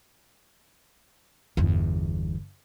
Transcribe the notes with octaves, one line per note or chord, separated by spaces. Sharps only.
G1 E2